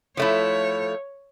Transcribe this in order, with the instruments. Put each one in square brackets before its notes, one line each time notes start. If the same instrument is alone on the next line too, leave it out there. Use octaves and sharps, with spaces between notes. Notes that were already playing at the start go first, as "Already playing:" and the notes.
[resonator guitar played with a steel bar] F3 A3 E4 [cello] C#5